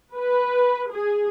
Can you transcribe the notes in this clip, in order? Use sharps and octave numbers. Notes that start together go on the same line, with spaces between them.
B4
G#4